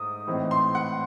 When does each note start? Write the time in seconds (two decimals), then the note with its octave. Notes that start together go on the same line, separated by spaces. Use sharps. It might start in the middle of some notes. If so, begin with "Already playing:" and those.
Already playing: G#2 A3 D#6
0.27 A2 E3 C4 D#4
0.51 C6
0.75 F#5